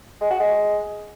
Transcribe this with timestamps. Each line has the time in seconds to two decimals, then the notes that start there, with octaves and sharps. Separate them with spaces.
0.21 G#3
0.30 F#4
0.40 G#3